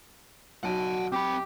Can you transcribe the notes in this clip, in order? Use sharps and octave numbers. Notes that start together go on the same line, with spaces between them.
B1 F#4 F#5 A5 D7
C4 G4 B5